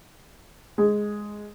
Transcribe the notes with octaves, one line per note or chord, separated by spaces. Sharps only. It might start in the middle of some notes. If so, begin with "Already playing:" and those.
G#3